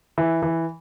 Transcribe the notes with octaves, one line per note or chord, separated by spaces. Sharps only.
E3
E3